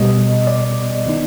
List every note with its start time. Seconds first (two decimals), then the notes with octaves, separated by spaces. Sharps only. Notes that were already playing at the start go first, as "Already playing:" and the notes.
Already playing: B2 G3 B3 D#5
0.47 D5
1.06 D#3 B3 D#4